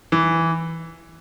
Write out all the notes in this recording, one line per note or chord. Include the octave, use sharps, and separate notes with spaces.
E3